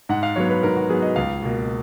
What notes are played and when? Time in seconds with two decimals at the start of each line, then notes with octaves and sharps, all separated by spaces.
0.09 G#2 F#5
0.23 F5
0.36 F#3 B3 C#5
0.50 B4
0.63 G#2 A#4
0.76 F#4
0.89 F#3 B3 G#4
1.02 D#5
1.16 C#2 F5
1.43 B2 A#3